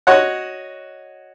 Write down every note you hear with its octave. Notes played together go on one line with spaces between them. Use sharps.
F#4 C#5 D#5 F#5